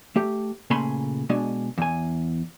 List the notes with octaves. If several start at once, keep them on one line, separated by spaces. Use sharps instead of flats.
A3 G4
A#2 C#3 A3 G#5 B5 C6
B2 G#3 D4 G#5
E2 G#5